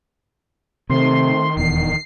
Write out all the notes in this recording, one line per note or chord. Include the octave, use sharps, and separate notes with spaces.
C3 D#3 A3 C4 C6
D#1 E2 D3 C7